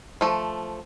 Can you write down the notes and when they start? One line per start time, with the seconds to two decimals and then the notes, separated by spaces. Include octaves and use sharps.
0.21 F3 A3